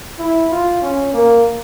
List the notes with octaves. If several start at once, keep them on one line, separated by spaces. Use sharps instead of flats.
E4
F4
C#4
A#3